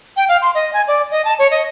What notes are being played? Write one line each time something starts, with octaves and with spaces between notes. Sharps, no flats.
G5
F5
C6
D#5
G#5
D5
D#5
A5
C#5
D#5